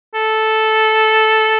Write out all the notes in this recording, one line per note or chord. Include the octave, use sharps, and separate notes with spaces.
A4